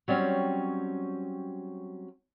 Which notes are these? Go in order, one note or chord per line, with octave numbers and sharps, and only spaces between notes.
F#3 G3 C4 C#4